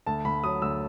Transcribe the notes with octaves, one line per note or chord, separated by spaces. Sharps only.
D2 A5
D2 B5
F#3 D#6
D2 E6